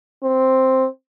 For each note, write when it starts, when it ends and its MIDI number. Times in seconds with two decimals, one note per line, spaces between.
0.23 0.87 60